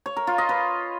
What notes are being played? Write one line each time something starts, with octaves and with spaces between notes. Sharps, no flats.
C#5
A#4
F4
D#5
B4